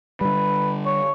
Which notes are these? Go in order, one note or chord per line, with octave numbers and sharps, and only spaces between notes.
D3 G3 B4
C#5